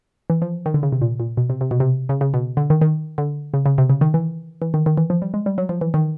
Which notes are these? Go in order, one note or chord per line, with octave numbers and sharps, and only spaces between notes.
E3
F3
D#3
D3
C#3
C3
A#2
A#2
B2
C3
C3
B2
C3
C#3
C#3
B2
D3
D#3
D#3
D3
C#3
C#3
C3
C#3
D#3
E3
E3
D#3
D#3
E3
F3
G3
G#3
G3
F#3
F3
E3
D#3